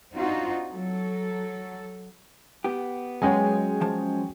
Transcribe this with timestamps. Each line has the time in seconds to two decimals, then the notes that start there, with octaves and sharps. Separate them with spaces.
0.11 C4 D4 D#4 F4 F#4
0.71 F#3 A4
2.64 B3 G4
3.22 F#3 G#3 C#4 C#5 G5 G#5
3.81 F3 A5